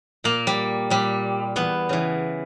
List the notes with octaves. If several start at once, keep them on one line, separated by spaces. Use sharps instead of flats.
A#2 A#3
G3
A#2 G3
E2 B3
C#3 E3